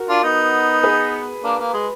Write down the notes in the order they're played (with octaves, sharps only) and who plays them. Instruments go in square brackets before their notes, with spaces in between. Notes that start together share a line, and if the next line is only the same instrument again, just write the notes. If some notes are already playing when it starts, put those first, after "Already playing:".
Already playing: [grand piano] F#4 A#4
[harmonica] D4 F4
B3 D#4
[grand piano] G#4 B4
[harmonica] A#3 D4
A#3
G#3